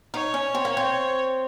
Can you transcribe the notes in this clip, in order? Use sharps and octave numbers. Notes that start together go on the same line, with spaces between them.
D#4 C#5
C#4
C4
A#3
C4